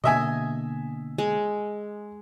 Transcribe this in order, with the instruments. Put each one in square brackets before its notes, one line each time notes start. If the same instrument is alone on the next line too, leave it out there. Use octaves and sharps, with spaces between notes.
[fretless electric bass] B2 D3 A#3 [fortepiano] D#5 E5 G#5
[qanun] G#3